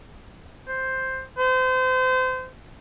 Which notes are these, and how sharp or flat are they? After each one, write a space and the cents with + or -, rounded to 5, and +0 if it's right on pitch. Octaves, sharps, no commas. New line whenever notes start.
C5 +5
C5 -30